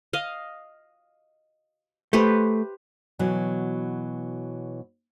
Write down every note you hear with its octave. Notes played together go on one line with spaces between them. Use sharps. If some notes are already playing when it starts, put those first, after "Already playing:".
D#5 F5
A3 G4 B4 C5
B2 E3 F#3